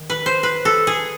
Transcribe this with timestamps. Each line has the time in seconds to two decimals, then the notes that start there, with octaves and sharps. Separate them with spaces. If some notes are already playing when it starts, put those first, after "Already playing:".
Already playing: D#3
0.10 B4
0.26 C5
0.43 B4
0.65 A4
0.87 G#4